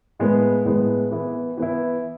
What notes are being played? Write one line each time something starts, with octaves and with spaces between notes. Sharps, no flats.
A2 G#3 B3
A2 G#3 B3
E3 B3 E4
E3 B3 E4